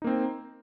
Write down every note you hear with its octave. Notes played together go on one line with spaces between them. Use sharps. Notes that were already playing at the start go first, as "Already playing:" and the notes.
A#3 C4 D#4